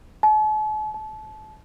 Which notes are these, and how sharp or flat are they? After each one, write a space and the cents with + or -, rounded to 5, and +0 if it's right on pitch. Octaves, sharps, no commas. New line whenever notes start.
A5 -45
A5 -30